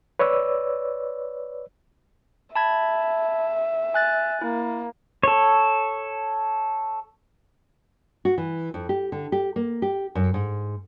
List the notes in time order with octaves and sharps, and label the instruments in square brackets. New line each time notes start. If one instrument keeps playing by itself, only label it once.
[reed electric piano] B4 C#5 D5 E6
[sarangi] E5 [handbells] A5 B5 G#6
[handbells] G#5 F#6 A6
[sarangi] A#3 [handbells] E4
[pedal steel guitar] A4 C#5
[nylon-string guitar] F#4
E3
F2
G4
D3
G4
A#3
G4
F#2
G#2